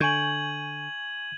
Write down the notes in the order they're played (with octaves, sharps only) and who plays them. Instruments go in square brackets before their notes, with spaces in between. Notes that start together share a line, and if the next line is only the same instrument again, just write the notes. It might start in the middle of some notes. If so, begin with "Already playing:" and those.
[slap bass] D3 [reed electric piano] G#5 C#6 G6 [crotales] G#6 D#7 F#7